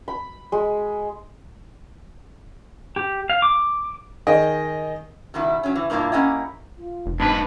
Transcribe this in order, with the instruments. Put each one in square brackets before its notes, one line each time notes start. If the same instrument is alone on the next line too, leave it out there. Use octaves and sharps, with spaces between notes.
[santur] B5
G#3
[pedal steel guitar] G4
F5
D6
[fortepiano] D#3 G#4 D#5 G5
[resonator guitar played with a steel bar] B2 D#3 G3 E4
F#3 C#4
E3
G2 B2 A#3 D4 E4 F4
A#3 C#4 E4 G4 D#5 F#5
[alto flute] F4
[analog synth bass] F1
[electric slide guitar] G#2 B4 [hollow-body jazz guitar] B3 D4 D#4 [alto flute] A5